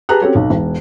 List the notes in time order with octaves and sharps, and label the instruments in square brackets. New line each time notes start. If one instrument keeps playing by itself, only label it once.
[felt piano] G4 G#4 B4 A5 A#5 F#6
C4 C#4 F#4 G4 A4 C#5
B1
E1